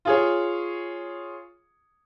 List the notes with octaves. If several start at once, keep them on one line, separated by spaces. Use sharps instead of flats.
F4 G#4 C#5